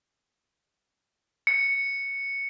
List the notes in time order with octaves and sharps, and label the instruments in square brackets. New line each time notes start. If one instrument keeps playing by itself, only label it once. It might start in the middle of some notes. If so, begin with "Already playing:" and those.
[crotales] C#7